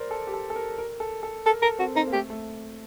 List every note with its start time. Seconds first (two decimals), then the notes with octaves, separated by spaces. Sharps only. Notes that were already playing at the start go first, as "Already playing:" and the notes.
Already playing: A#4 C5 D5
0.11 A4
0.27 G4
0.34 A4
0.50 A4
0.56 A#4
0.78 A#4
1.00 A4
1.23 A4
1.46 A4 A#4
1.62 A4 A#4
1.78 C4 F#4
1.95 C4 D#4
2.07 A#3
2.13 A3 G4
2.30 A3